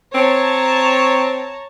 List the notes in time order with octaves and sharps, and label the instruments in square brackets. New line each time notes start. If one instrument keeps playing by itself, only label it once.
[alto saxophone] C4 [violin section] C#5 A5 A#5